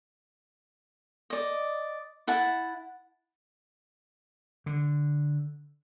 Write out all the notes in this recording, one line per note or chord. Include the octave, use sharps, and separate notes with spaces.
D5 D#5
E4 F#5 A5
D3